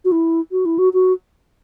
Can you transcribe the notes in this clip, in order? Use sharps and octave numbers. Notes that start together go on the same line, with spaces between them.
F#4
E4
F#4
E4
F#4
F#4